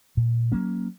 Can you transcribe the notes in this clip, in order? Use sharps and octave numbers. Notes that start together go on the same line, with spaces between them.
A#2
F#3 A#3 C#4